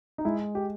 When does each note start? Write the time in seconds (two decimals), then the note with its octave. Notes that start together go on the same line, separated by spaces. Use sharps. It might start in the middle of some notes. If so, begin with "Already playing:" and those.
0.18 D#4
0.25 G#3 E4
0.55 G4